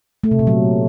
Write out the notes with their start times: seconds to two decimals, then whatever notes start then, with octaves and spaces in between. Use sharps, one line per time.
0.24 A3
0.31 C3
0.39 A#2
0.47 F#3